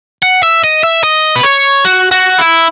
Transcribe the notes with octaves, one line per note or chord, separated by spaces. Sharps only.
F#5
E5
D#5
E5
D#5
B4
C#5
F#4
F#4
E4